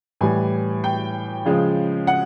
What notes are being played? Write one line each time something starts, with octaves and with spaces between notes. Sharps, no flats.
A2 E3 G3 G#5
G5
C#3 F3 G#3
F#5